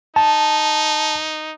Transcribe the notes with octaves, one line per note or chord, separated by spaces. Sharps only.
D#4 A5